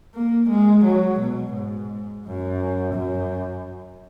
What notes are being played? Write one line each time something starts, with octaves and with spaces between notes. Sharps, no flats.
A#3
G#3
F#3
B2
G#2
F#2
F#2